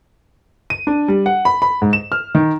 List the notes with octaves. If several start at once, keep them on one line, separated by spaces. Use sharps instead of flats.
D#7
D4
G3
F#5
B5
B5
G#2
E7
F6
D#3